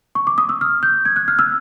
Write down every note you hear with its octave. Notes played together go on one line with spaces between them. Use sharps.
C#6
D6
D#6
E6
F6
G6
G#6
F#6
F6
E6